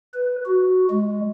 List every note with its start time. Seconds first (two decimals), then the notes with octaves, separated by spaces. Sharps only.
0.14 B4
0.46 F#4
0.90 G#3